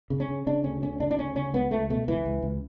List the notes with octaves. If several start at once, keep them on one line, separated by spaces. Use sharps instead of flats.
C#3
C#4
C#3
C#3 D4
D2 C#4
D2 C#4
C#3 D4
D4
D2 C#4
C#3 C#4
C#2 B3
C#2 A3
B2 A3
C#2 E3
C#2
C#2